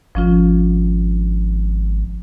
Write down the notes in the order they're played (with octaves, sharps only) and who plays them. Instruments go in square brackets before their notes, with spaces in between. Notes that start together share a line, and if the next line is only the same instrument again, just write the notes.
[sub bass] G#1 [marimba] F3 C#4 F4